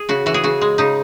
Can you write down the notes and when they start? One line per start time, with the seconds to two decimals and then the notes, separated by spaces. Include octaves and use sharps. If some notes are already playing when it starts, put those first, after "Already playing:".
Already playing: G#4
0.09 C#3 F#4
0.26 E3 F#4
0.34 G#4
0.44 C#3 F#4
0.61 G#3
0.78 C#3 D#4